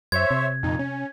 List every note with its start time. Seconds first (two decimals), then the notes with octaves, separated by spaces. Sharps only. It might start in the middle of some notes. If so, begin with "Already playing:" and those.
0.12 F#2 C5 C#5 E5 G#6
0.31 C3
0.63 F2 A#2 D#4
0.79 C#4